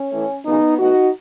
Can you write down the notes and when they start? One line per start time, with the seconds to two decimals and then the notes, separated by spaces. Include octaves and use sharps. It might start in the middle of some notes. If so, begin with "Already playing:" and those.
Already playing: C#4
0.11 A2 E3 A3
0.45 D#2 C#3 F#3 B3 D#4
0.79 A2 E3 B3 D#4 F#4